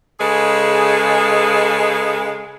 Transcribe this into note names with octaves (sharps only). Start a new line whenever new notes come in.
C#3 G#3 G#4 A4 B4